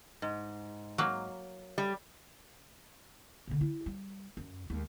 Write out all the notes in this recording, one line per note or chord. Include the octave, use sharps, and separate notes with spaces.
G#2
F#3 A#3
G3
B2 D3
E4
G3
F#2
D#2 G#3